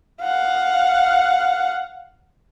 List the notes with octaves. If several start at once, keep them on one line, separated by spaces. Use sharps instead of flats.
F5 F#5